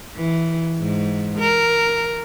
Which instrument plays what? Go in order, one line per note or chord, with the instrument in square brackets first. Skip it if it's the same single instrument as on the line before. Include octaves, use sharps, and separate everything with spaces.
[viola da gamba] E3
G#2
A#4